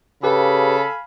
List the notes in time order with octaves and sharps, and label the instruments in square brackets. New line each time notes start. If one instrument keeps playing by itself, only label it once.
[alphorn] C#3 [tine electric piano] G4 B4 [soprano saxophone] A4 [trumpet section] F5 G#5 B5